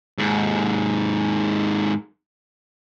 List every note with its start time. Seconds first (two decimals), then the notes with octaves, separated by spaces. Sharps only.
0.18 D#2 G#2